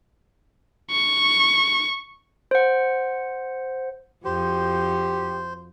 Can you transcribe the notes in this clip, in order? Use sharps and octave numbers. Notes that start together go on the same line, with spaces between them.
C#6
C5 F#5
F2 F#4 G4 C5